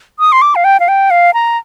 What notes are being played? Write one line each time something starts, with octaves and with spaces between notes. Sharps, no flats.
D#6
C6
D6
F5
G5
F5
G5
F5
A#5